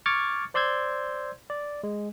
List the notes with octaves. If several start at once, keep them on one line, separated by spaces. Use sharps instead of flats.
C#6 D6 F6 G#6 A6 C#7
C5 D5 C6 E6 G6 G#6
D5
G#3